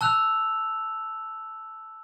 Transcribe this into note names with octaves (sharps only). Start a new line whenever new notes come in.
A5 E6 F#6 F7